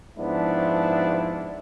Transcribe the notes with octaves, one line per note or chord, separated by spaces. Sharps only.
G#2 F3 B3 D4 E4